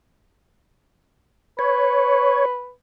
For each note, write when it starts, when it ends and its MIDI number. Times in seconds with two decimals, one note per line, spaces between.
1.59 2.71 71
1.59 2.45 73